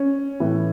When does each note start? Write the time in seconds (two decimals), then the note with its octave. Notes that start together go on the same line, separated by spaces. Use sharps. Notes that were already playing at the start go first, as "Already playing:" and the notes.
Already playing: C#4
0.40 A2 E3